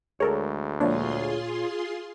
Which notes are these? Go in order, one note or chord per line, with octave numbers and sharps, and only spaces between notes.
D2 G#3 A4 A#4 C#5
A#2 F3 G#3 D4 F4 G#4 C#5 C6